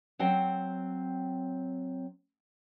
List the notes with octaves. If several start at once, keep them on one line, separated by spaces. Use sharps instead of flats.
F#3 C4 C#5 G5